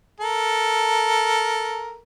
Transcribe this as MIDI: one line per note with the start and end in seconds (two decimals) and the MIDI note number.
0.20 1.99 69
0.20 1.99 70